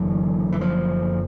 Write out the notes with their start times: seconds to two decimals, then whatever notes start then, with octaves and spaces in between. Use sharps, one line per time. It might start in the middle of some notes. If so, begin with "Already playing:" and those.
Already playing: F#1 F#2 D3 E3
0.52 E3
0.61 F3